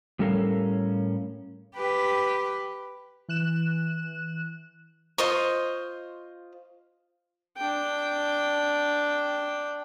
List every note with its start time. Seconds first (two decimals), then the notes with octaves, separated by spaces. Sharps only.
0.19 A2 G3 C#4 A4 A#4 F5
1.76 G4 B4
3.29 E3 F#6 E7
5.18 F4 C5 D#5 C#6
7.58 D4 G5